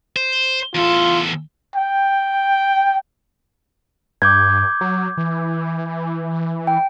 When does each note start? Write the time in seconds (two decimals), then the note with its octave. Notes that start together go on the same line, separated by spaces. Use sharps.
0.16 C5
0.75 E2 F4 A4
1.76 G5
4.22 G2 D6 G6 G#6
4.81 F#3
5.17 E3
6.67 G5